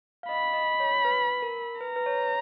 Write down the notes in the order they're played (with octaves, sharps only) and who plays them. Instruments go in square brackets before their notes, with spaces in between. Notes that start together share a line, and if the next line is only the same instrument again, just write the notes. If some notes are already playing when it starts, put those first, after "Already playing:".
[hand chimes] F5
[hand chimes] D#5 [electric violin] B5
[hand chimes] D#5
C#5
B4
A#4
[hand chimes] B4 [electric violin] A#5
[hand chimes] B4
C#5